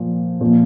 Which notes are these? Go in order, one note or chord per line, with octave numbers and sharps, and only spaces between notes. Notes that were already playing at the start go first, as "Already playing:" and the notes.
Already playing: A#2 F3
A#2 F3